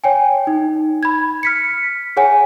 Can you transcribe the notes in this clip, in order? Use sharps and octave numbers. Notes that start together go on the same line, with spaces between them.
C#5 G5 G#5
D#4
B5 G#6
F6 B6 C#7
G#4 C#5 F#5 G#5